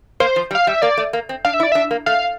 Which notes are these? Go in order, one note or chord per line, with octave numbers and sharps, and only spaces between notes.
A#3 C5
F3
G3
F5
G3 E5
A#3 D5
A3
A#3
C4
D4 F5
E5
E4
D5
D4 E5
A#3
A3 F5